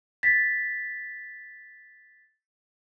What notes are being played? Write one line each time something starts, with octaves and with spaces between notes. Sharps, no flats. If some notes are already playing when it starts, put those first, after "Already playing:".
A6 B6